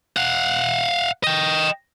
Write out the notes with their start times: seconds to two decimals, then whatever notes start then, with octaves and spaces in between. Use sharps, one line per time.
0.17 F5 F#5
1.24 D#5 G5